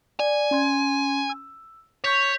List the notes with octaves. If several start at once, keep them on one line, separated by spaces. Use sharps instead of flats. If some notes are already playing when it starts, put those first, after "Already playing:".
D5 G#5
C#4 C6 G#6
E6
C#5 C#6 G6 B6